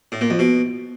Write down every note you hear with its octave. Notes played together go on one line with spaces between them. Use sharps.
A2
A#2
F2
B2